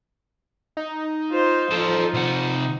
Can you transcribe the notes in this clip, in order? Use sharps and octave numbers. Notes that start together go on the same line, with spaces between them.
D#4
F4 C5
F3 A4 C5
C3 F#5